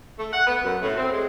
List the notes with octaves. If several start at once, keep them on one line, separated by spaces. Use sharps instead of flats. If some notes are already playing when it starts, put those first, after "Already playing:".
A3
F#5
B3
F#2
A2
C4
G#3